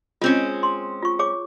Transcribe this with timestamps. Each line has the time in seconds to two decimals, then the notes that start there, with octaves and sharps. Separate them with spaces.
0.21 G#3 C4 C#4 F4
0.63 C6
1.02 F4 C#6
1.19 G#4 C#5 D6